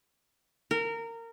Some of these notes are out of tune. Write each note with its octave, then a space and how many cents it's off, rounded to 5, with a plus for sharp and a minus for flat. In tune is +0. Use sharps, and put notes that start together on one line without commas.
A#4 -20